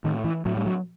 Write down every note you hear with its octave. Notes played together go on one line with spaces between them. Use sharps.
A2 D#3
E3
A2 F#3
G3
F#3